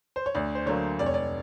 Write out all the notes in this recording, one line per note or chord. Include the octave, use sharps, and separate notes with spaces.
C5
C#5
D2 D5
C5
D3 F#3 A#3 C#5
F1 D5
C#5
D5